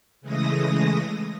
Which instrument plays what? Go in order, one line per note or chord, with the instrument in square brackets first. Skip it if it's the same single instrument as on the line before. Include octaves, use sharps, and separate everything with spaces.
[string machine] C#3 E3 G#3 A3 D#6 A#6